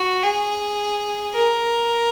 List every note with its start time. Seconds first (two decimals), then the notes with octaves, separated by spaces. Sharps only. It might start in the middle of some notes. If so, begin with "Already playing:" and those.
Already playing: F#4
0.23 G#4
1.34 A#4